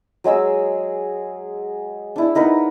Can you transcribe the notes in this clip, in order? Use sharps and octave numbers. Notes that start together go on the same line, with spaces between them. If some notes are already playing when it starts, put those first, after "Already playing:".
F#3 G#3 G#4 E6
D4 E4
D#4 A#4 B4 F#5